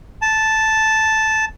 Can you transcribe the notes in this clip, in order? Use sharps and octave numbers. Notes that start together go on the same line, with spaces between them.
A5